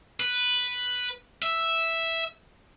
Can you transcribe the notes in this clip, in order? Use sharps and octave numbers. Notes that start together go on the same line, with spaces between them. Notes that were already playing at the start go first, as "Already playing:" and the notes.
B4
E5